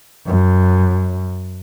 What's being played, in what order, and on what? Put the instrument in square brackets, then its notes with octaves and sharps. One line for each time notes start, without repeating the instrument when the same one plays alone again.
[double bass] F#2